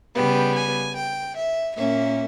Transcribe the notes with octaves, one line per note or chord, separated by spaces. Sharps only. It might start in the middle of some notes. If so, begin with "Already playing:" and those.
C#3 G3 B3 G5
G#5
G5
E5
A#2 A#3 C#4 E5